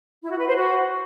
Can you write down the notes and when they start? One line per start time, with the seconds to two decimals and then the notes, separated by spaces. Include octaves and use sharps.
0.22 E4
0.31 F#4
0.39 B4
0.47 C5
0.55 F#4